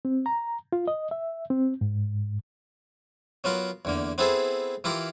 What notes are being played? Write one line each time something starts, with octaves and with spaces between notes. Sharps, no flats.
C4
A#5
F4
D#5
E5
C4
G#2
F#3 B3 F4 A#4
E2 D3 A#3
B3 C4 E4 G#4 A4 C5
E3 E4 F4 G4 A#4